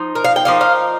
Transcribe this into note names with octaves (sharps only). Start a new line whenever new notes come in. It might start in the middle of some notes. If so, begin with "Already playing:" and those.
Already playing: F3 D#4
A#4
F5
G5
F3 A#3 D#4 F5
F5